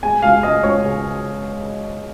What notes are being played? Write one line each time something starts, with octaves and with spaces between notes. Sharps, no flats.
G#3 G#5
C#2 F5
C#2 D#5
C#2 C#5
C#3